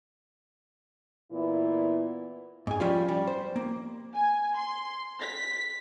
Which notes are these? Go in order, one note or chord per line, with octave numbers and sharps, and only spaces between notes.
A#2 E3 B3 E4
G#2 G#5
F3 G3 C#4 F4
G3
C5
A#3
G#5
C6
B6